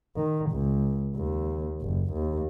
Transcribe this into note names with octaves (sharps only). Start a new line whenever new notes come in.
D#3
C#2
D#2
F#1
D#2